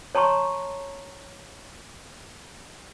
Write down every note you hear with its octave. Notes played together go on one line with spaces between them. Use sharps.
C#5 A5 A#5 C6 C#6